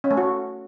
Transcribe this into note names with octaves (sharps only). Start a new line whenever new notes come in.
C#4
A3
F#4